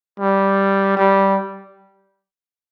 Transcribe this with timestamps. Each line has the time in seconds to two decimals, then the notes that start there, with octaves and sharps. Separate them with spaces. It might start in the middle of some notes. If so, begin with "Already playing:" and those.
0.20 G3
0.97 G3